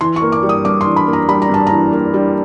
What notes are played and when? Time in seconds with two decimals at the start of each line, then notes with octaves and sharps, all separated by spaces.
0.01 E3 C6
0.16 C#6
0.22 A#3
0.32 D6
0.43 G3
0.49 D#6
0.65 G2 D6
0.81 C6
0.86 E3
0.96 B5
1.07 A#3
1.13 A#5
1.29 G3 B5
1.42 A#5
1.49 G2 A5
1.67 E3 A#5
1.92 A#3
2.14 G3